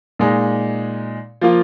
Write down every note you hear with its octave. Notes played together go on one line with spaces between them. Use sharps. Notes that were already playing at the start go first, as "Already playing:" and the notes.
A#2 G#3 D#4
F3 A#3 F4